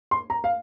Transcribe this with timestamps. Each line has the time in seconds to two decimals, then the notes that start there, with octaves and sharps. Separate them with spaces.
0.11 C6
0.30 A#5
0.44 F5